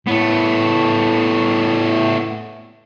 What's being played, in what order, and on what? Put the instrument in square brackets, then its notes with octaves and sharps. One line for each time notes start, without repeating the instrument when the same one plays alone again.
[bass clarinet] A2 [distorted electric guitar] A3 B3